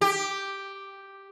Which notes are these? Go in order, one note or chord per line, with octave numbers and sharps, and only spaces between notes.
G4